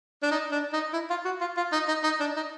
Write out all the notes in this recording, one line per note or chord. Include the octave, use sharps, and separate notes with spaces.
D4
D#4
D4
D#4
E4
F4
F#4
F4
F4
D#4
D#4
D#4
D4
D#4